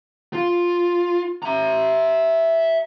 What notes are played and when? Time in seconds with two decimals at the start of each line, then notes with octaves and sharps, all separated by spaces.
0.33 F4
1.43 E5 A#5